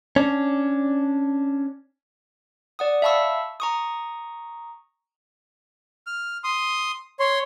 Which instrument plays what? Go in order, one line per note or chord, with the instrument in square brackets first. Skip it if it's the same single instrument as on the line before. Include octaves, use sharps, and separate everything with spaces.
[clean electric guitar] C#4 D4
[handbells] D5 F#5 D#6
E5 F5 A5 B5 C#6 E6
A#5 C#6 D#6
[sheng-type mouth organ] F6
C6 D#6
C#5 C6